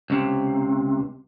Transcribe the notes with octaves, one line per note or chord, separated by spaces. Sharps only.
C#2 C3